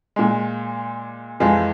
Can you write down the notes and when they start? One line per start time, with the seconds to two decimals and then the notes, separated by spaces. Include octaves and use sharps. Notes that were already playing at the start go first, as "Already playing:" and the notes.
0.16 A#2 G#3
1.40 F2 E3 G#3 F4